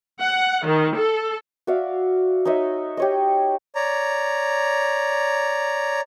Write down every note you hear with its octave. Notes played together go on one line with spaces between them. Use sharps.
F#5
D#3
A4
F#4 D5 E5 F5
D#4 C#5 D#5 E5
G4 C#5 D#5
C#5 D5 A#5